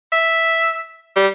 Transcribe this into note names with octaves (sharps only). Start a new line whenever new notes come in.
E5
G3